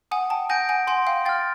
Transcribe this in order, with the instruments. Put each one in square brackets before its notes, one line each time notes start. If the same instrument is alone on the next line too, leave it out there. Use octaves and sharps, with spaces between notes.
[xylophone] F#5 G#5 [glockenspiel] D#6
[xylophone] G5 A5
[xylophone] F#5 G#5 [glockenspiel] G6 A#6 D7
[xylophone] F#5 G#5
[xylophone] F#5 G#5 [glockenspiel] C6
[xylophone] F5 G5
[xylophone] F5 G5 [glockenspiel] F6 A6